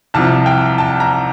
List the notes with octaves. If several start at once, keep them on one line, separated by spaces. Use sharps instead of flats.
C2 C3 F3 A5
G5
A5
A#5